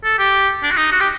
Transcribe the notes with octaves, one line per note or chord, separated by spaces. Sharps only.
A4
G4
D4
F#4
D#4
F#4
G4